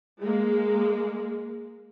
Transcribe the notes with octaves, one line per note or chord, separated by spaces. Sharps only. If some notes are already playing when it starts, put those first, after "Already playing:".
G#3 A#3